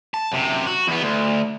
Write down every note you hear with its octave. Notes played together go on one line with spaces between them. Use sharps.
A5
F#2 C3
F#4
E2 B3
D2